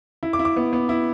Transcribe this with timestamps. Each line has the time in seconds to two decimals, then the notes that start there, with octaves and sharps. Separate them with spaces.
0.23 E4
0.33 D6
0.39 E4
0.45 D6
0.56 B3
0.73 B3
0.89 E4